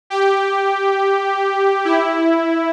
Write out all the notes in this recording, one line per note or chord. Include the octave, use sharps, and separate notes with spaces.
G4
E4